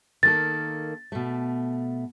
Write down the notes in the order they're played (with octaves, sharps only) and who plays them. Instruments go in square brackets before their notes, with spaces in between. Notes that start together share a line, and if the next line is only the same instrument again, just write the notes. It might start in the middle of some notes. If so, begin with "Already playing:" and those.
[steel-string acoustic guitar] D#3 A#3 A4 [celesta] A6
[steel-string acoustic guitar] B2 A3